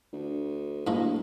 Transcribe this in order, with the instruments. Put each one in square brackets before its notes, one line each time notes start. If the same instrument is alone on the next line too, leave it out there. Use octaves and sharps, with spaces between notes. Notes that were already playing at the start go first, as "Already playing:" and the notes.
[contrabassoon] D2
[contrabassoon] D2 [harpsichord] A2 G#3 A#3